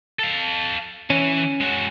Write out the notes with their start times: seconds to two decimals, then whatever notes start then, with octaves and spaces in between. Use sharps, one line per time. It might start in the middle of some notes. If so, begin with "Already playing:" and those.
0.19 A4 F5
1.10 E3 C#4
1.61 G#3 F#4